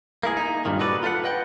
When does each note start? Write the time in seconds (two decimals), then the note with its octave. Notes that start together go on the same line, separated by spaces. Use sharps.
0.23 A#3 E4 G#4
0.37 D#4
0.65 G2 A#2 D#3
0.79 F#4 A4 B4 C#5 D5
1.03 F4 A4 B4 F5 F#5
1.24 B4 D#5 F#5 G5